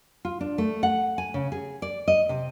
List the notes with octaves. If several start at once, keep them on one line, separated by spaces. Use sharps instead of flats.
F4
D4
A3
F#5
G#5
C#3
G#4
D5
D#5
C3